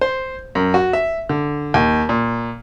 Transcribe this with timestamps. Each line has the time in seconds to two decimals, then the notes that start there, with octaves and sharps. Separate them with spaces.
0.01 C5
0.55 F#2
0.74 F#4
0.93 E5
1.29 D3
1.74 D#2
2.09 A#2